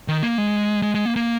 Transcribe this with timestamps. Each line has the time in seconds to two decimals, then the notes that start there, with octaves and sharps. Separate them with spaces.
0.08 D#3
0.23 A#3
0.38 G#3
0.82 G#3
0.95 G#3
1.06 A#3
1.16 A#3